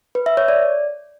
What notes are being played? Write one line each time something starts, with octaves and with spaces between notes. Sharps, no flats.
B4
E5
C#5
D5